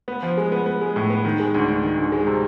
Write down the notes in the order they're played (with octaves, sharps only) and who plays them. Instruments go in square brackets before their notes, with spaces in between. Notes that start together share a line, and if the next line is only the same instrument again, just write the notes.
[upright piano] B3
F3
G#3
B3
B3
G#3
A2
B3
D#3
G#3
D2
D2
D#3
D2
G#3
C3